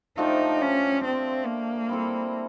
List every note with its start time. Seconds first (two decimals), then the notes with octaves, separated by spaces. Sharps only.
0.17 F3 A3 D4 D#4 G4
0.61 C#4
1.04 C4
1.46 A#3
1.89 G3 C4 E4 A4